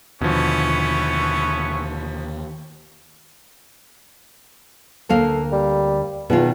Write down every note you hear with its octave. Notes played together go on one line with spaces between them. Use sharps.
D#2 B2 D3 F3 B3 C#4 E4 C#6
D2 A#3 A4 F5
G3
E2 B2 D#3 F4